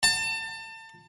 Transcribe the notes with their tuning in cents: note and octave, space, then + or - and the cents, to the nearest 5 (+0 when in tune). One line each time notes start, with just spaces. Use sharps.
A5 +30